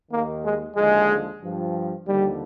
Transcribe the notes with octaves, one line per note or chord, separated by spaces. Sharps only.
D#2 D#3 A#3
G#3
D#2 D3 F3 G#3
G2 F3
D#2 D3 F3 G3